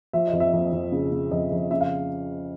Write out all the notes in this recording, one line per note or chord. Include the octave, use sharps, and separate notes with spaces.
F3 E5
D#5
F2
E5
F2
F2
C#3
C#3
F2 D#5
F2
C#3 E5
F5